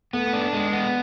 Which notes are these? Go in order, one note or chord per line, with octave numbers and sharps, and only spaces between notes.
A3 B3
D4
G#3
B3